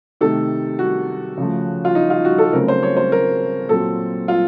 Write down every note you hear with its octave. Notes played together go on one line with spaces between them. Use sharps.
C3 D#3 A3 A4
F#4
C#3 F3 A3
F4
D#4
F4
F#4
A4
C#3 F#3 A3 C4 A#4
C5
C#5
C5
A#4
A#2 F#3 C4 A4
F4